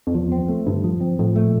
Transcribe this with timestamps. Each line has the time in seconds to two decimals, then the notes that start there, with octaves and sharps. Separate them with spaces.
0.07 F2
0.14 E2 F3
0.32 C4
0.49 A3
0.66 G2 D3
0.84 F3
1.01 C4
1.19 A2 F3
1.36 A3
1.44 A#2